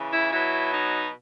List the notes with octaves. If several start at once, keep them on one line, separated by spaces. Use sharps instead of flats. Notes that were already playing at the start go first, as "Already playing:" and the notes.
Already playing: C#3 E3
E4
B2 F#3 E4
D#4